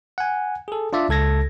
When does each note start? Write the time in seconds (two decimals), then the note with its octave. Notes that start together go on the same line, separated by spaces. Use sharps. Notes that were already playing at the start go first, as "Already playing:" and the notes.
0.18 F#5 G#5
0.68 G#4 A4
0.93 D4 F4 D5 E5
1.09 C#2 A4 G#6 A#6